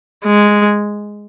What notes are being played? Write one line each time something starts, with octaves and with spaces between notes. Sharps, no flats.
G#3